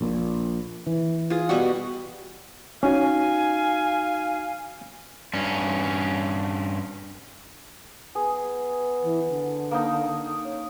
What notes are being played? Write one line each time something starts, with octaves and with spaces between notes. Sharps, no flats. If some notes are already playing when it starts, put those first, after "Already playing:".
A#1 A#2
E3
F4 G#4
B2 G3 F#4
C#4 D#4 F#4 F5 G#5
G2 C#4
B3 G#4
E3
D3
A#3 D#4
C#4